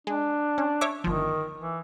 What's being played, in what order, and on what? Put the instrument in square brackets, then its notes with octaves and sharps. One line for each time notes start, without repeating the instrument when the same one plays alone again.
[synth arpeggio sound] G#3 [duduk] D4
[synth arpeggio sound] C#4
C#5 E5 D6
[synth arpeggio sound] G1 F3 [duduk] D#3
[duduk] E3